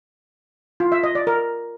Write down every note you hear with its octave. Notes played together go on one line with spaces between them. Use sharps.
F4
E5
D#5
D5
A#4